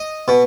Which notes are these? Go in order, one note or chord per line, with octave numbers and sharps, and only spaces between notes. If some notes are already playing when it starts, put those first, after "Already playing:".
Already playing: D#5
B2